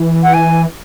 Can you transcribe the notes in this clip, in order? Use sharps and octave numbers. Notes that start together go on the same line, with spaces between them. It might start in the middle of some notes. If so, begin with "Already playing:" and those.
Already playing: E3
F#5
G#5